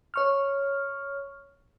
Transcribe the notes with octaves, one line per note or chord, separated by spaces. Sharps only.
C#5 C#6 F6